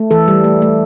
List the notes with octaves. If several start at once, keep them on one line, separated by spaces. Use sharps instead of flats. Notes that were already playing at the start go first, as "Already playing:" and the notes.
Already playing: A3
E3 A4
G3
A3
A3